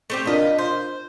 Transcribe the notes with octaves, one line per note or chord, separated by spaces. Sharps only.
A3 C4 G4
D4 F4 A#4 B4 D#5
C5